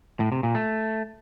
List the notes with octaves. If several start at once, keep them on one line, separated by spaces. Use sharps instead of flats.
A2
C3
A#2
A3